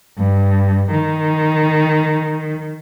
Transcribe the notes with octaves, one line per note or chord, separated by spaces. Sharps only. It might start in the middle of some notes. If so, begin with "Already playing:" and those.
G2
D#3